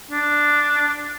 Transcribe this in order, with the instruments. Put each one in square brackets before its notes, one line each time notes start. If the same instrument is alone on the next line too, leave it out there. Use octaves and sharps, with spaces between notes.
[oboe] D4